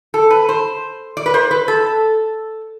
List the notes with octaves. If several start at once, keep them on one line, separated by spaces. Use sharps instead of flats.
A4
B4
C5
D5
B4
C5
B4
A4